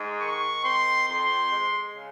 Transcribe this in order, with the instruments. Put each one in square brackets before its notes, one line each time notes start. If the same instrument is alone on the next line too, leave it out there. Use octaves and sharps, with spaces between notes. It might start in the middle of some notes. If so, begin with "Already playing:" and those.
Already playing: [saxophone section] G#2 G#3
[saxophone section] D#3 [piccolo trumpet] C#6
[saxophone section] C4 [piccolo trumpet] C6
[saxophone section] F2 [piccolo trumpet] C6
[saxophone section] G#3
C#3